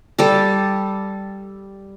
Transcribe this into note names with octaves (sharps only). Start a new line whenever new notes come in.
G3 A4